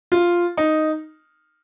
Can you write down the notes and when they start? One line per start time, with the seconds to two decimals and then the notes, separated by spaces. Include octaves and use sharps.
0.12 F4
0.57 D#4